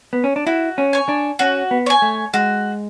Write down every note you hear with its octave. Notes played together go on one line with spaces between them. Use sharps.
B3
C#4
D4
E4 F#4
C#4
C#5 G#5
D4
C#4 F#4
B3
C#5 G#5
A3
G#3 F#4